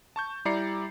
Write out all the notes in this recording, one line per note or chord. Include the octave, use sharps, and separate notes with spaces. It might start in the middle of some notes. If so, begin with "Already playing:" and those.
A5 C#6 G6
G3 E4 D5 A#5 C7 C#7